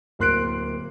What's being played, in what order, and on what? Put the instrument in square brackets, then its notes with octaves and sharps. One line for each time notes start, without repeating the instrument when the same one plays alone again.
[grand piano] D1 A#3 C6 F#6 C7 D7